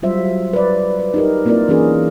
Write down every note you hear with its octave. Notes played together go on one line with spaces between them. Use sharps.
F#3 G3 F4 C5 E5
B4 D5
B4
D#4 G4 A#4
A#3 C4 E4 F4 A#4 D5
E3 A#3 C#4 D#4 G#4 A#4